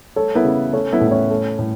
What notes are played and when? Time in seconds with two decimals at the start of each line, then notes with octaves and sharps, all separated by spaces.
0.16 A3 A4 C#5
0.35 B3 E4
0.44 C#3
0.73 A3 C#4
0.93 B3 E4
1.01 A2
1.07 E4
1.11 C#4
1.31 A3
1.59 A2